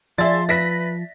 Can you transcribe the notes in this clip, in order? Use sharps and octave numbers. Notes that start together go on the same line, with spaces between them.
F3 G#4 D5 E5 C6 A6
B4 E5 A#6 B6